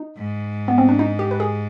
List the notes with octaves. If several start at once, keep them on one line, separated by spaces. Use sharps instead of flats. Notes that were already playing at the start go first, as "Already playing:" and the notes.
Already playing: D#4
G#2
B3
C4
D4
D#4
G4
B4
G#4